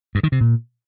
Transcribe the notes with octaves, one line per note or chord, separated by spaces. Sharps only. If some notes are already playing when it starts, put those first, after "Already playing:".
G2
D#3
C3
A#2